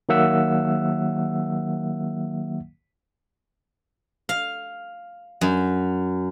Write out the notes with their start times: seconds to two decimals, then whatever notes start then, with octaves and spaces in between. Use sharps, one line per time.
0.09 D#3 F#3 A#3 E5 F#5 E6
4.29 F5
5.41 F#2